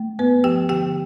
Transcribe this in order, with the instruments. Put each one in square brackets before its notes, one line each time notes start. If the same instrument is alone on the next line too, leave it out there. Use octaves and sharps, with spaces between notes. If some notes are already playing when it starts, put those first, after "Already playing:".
Already playing: [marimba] A3
G2 B3 B4
F3 G4 G5
D3 G4 G5